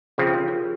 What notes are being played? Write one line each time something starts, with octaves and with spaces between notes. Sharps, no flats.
C#3 F3 C4 F4 G#4
G4 A#4
F4 G#4